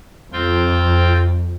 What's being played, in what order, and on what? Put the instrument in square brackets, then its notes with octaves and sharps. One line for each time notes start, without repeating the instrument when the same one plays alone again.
[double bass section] F2 [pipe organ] C4 F4 G5